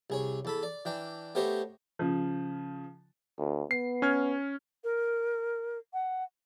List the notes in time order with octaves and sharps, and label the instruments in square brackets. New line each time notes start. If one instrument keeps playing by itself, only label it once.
[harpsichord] C2 G#4 C#5
E2 A4 B5
D5
E3 D4 G5
A3 B3 G4 C5 C#5 D#5
[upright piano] C#3 F3
[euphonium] D2
[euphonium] B3 [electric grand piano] C7
[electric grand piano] C#4 F6 G#6
[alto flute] A#4
F#5